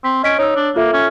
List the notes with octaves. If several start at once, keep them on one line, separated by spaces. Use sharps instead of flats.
C4 B6
C#4 D#5 B6 D7
D#4 C#5 E6
D4
A#3 F4 A4 E5
C#4